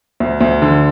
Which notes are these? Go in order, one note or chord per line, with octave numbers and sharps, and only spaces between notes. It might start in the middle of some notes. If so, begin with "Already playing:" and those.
D2
D2
D3